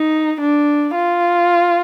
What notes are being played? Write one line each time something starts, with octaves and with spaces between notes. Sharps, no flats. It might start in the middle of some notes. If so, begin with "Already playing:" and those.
Already playing: D#4
D4
F4